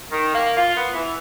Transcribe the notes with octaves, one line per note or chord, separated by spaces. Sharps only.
D#3
A#3
F4
B3
E3